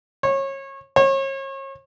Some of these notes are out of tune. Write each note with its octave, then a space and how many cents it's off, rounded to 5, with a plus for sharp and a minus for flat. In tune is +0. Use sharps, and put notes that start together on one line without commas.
C#5 -25
C#5 -35